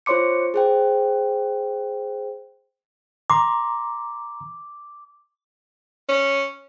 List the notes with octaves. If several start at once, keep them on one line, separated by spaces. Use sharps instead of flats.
F4 C5 C#5 C6 D6 C#7
G#4 C5 G5
A#5 C6 D6
C#4